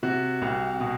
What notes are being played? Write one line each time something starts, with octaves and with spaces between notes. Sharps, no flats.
C3 F#4
C2
B2